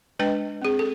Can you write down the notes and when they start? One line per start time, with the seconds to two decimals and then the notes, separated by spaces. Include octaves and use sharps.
0.19 G#3 D4 B4 D#5 G5
0.62 C4 G#4
0.79 A4